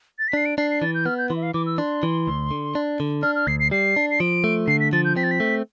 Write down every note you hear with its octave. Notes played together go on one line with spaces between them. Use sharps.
A6
B6
D4 C7
D7
D4 C7
C7
E3 A6
G6
B3 F6
G6
E3 C6
E5
F5
E3 D6
E6
D4 C6
E3
D2
D3
D4
D3
D4 F6
F6
D2 C7
C7
G3 C7
D4
C7
F3 D7
A3
D3 C7
B6
F3 A6
G6
C4 B6
A6
B6
A3